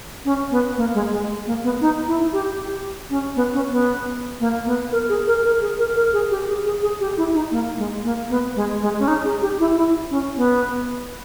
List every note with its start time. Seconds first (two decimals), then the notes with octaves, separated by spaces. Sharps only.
0.25 C#4
0.51 B3
0.77 A#3
0.94 G#3
1.11 G#3
1.47 A#3
1.64 B3
1.81 D#4
2.07 E4
2.33 G4
2.59 G4
3.10 C#4
3.36 B3
3.54 C#4
3.71 B3
4.40 A#3
4.66 B3
4.92 A#4
5.09 G#4
5.27 A#4
5.44 A#4
5.62 G#4
5.79 A#4
5.96 A#4
6.13 G#4
6.30 G4
6.48 G#4
6.66 G#4
6.82 G#4
7.00 G4
7.17 E4
7.34 D#4
7.51 A#3
7.78 G#3
8.04 A#3
8.30 B3
8.56 G#3
8.81 G#3
8.99 C#4
9.08 D#4
9.25 G#4
9.41 G4
9.59 E4
9.76 E4
10.10 C#4
10.37 B3